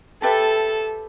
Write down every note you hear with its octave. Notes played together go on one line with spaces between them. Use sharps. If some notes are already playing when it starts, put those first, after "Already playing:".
G4 A4 B4 E5 A5